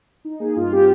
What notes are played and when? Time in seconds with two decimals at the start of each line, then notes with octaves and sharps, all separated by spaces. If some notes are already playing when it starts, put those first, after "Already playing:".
0.25 D#4
0.40 A#3 G#4
0.56 G2 F4
0.72 C4 G4